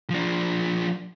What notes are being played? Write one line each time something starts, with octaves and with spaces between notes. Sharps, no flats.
F3 D4